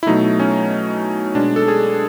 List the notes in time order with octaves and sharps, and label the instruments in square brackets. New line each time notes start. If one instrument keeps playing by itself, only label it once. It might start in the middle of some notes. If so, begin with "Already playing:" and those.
[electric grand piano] E4
B2 F#3 A3 D#4
C#4
B2 G#3 D4
A4
G#4